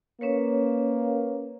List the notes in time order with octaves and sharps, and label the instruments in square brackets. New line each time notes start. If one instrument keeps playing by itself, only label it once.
[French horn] A#3 [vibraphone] C#4 B4 C#5